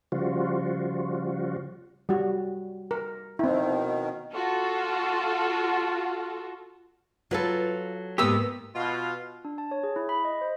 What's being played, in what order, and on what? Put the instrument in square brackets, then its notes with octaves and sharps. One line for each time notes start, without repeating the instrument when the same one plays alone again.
[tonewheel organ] C#3 F3 G3 F4 F#4
[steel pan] G3 F#4
A#4
[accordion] B2 D#3 [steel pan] C4 E4
[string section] F4 F#4 A4
[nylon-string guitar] F#3 A4 [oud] F4 B4
[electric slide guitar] G#2 B3 G4 [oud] A#3 B4 [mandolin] D#6 E6
[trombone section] B2 [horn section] F4 F5
[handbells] D4
A5
C#5
G#4
E4
B5
D#5
C5